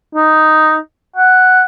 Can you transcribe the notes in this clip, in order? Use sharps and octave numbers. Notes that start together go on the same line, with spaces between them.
D#4
F#5